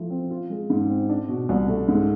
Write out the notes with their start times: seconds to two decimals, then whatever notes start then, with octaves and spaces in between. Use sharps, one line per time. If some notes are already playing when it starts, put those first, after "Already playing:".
Already playing: F3 A3 E4
0.10 C4
0.30 F4
0.50 G#3
0.70 G#2
0.89 C4
1.09 D4
1.28 B2
1.49 C2
1.68 A3
1.88 G#2